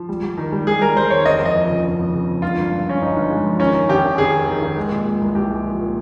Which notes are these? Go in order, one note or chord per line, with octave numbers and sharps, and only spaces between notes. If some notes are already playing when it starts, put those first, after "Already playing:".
Already playing: F3
G3
G3
D#3
G3
G3 G#4
G3 A#4
G3 C5
D#2 C#5
F1 D#5
F2
D#5
F3
C#3
F1
F2
C#3
F3
G1 F4
G1
G2
G2 C#4
G1 D#4
G1
G#3
F3
D#3 C#4
D#3
F1 G4
F1
F1 G#4
D#3
D#3
F1
G#3
A#2
G#3
C2
C2 G4
G#3
F3
A#2